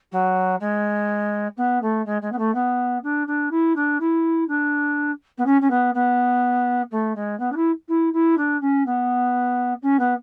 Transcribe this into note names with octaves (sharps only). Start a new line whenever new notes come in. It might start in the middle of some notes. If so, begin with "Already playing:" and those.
F#3
G#3
B3
A3
G#3
G#3
B3
A3
B3
D4
D4
E4
D4
E4
D4
B3
C#4
C#4
B3
B3
A3
G#3
B3
D4
E4
E4
E4
D4
C#4
B3
C#4
B3